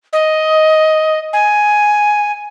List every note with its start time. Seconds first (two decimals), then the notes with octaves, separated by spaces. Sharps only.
0.13 D#5
1.33 G#5